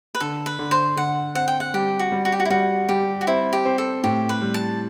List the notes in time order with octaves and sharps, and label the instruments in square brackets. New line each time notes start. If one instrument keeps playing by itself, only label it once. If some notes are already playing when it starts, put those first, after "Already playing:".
[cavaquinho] B4
[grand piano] D3 [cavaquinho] A4
[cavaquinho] B4
[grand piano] D3
[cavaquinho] C5
[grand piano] D3 [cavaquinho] F#5
[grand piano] C4 [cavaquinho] F#5
[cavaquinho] G5
F#5
[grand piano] G3 [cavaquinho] G4
[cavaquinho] F#4
[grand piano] G3
[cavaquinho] F#4
G4
F#4
E4
[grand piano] G3 [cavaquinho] F#4
[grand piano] G3 [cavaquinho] G4
[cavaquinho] F#4
[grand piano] C4 [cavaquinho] E4
[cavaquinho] G4
[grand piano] C4
[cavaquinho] A4
[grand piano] A2 [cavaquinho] G4
[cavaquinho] B4
[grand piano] G3
[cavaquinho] A5